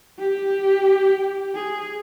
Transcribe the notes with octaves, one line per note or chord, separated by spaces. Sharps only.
G4
G#4